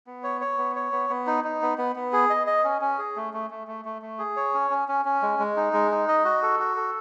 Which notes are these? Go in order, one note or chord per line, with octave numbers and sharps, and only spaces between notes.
B3
C#5
C#5
B3
C#5
B3
B3
D#4
D#4
B3
B3
B3
G#4
D#5
D#5
C#4
C#4
G#4
A3
A3
A3
A3
A3
A3
G#4
C#5
C#4
C#4
C#4
C#4
G#3
G#3
D#4
G#3
D#4
D#5
F#4
A4
F#4
A4